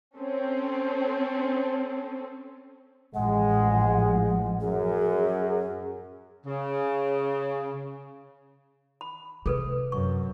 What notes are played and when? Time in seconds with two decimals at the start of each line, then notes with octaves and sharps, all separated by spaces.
0.17 C4 C#4 A4
3.14 A1 F3 G#3 F#5
4.61 F#2 G#4
6.46 C#3
9.01 B5
9.46 C3 G#4 A4 B4
9.92 F#2 C#6